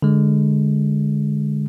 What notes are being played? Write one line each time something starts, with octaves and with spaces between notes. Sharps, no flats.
D3 G#3